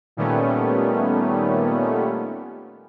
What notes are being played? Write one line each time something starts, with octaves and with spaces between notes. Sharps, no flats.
A#2 D#3 G3 A3 B3 C#4